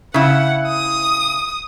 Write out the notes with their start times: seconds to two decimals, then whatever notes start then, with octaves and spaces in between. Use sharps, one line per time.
0.14 C#3 E4 F#5
0.67 D#6